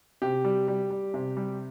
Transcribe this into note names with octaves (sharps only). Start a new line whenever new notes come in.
C3 G4
G3
G3
G3
C3
G3